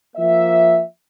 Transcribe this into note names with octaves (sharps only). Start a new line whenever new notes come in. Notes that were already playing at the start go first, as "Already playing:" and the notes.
F3 A#3 E5